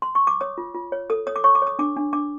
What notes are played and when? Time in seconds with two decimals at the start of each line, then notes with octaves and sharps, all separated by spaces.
0.02 C6
0.15 C#6
0.27 D6
0.41 C#5 D#6
0.58 F4
0.74 F4
0.92 C#5
1.10 A4 D#6
1.27 C#5 D#6
1.36 D6
1.44 C#5 C#6
1.55 D6
1.62 C#5 D#6
1.79 D4 D6
1.97 D4
2.13 D4 D6